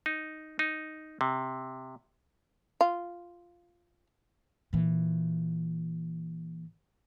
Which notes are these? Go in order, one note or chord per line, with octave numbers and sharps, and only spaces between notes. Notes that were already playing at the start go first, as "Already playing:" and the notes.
D#4
D#4
C3
F4
A#2 E3